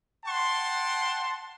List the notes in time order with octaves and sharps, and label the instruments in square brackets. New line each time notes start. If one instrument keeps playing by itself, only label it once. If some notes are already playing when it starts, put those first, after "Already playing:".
[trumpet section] F#5 G5 A5 C6